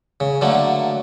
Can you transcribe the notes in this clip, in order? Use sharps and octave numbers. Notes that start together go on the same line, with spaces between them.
C#3
D3 F#3 A3 A#3